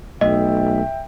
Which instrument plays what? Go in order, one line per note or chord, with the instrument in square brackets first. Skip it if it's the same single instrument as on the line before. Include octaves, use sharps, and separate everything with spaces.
[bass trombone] B1 [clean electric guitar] A3 [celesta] D#5 [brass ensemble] E5 G5